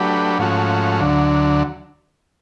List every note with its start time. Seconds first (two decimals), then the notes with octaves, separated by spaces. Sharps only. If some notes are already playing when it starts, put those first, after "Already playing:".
Already playing: F#3 A3 D4 G4 B4
0.39 G#2 F3 A3 C#4 F#4
1.01 D2 D3 F#3